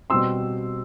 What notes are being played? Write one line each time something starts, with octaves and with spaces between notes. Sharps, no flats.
B2 G3 C4 C6 E6